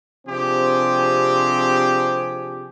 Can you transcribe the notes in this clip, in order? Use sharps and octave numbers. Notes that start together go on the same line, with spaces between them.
C3 F3 C4 D4 G4 G#4